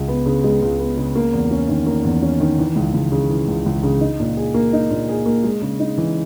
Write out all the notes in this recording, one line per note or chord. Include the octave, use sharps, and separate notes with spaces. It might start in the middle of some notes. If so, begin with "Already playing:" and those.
Already playing: C#2 G#3
B3
C#3
G#3
C#2
B3
C#3
A#3
E2
C#4
D#3
A#3
E2
C#4
D#3
E3
C#2
C#2
C#3
E3
C#2
C#2
C#3
D#4
A#2
G#4
A#3
D#4
A#2
G#4
A#3
G#3
C#3
D#4
E3